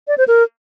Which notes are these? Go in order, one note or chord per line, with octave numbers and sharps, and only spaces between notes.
D5
C5
A#4